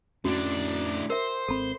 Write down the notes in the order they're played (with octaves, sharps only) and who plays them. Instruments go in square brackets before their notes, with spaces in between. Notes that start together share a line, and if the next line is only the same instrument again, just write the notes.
[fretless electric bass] F2 C#4 [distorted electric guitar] A2 D4 [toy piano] F#4
[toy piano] A#4 E5 [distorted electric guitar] C5
[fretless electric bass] G#1 C4 [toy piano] A4 B5